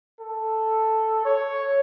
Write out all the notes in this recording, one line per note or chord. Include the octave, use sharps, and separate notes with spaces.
A4
C#5